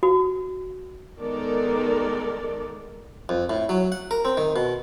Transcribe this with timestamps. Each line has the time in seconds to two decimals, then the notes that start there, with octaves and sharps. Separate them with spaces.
0.03 F#4
1.19 D#3 G#3 B3 A4 A#4 D5
3.29 F2
3.50 A2
3.69 F#3
3.92 F#5
4.11 A#4
4.25 C4
4.37 D#3
4.56 B2